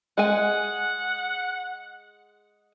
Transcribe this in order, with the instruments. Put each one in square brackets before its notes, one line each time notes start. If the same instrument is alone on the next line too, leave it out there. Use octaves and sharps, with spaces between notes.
[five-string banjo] G#3 G#5 [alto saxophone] F#5